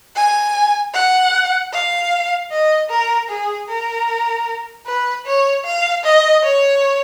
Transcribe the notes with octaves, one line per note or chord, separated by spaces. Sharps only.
G#5
F#5
F5
D#5
A#4
G#4
A#4
B4
C#5
F5
D#5
C#5